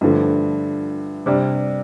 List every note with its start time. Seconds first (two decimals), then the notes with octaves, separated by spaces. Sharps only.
0.01 G2 D3 F3 A3
1.26 C3 G3 D4